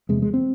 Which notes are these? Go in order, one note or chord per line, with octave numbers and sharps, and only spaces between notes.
E2 C3 G#3
G#3
C4